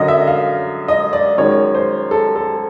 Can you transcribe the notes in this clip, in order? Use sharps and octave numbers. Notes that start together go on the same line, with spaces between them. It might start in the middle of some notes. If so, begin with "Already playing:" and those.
Already playing: F#2 D3 F#3 D#5
E5
F5
D#5
D5
F#2 D#3 G#3 C#5
C5
A4
A4